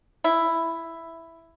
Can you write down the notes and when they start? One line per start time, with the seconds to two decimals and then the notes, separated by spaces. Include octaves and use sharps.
0.24 E4